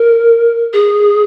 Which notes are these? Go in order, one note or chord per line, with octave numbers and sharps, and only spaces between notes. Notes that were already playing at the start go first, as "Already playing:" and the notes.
Already playing: A#4
G#4